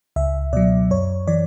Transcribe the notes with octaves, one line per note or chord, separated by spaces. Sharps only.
C#2 E5
B2 F#3 D5
F#2 C#5
E3 D5